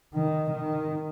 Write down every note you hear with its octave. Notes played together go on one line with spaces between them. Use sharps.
D#3
D#3